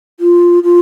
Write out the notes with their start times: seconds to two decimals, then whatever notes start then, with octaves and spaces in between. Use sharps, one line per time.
0.20 F4
0.63 F4